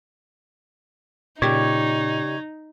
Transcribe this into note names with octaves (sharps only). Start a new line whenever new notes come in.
A#2 C#3 D#4 G4 C#5 D5